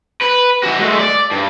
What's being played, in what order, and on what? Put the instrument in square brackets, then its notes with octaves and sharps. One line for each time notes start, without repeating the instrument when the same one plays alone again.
[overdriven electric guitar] B4
E3 F#4
G#3 A3
D5
G2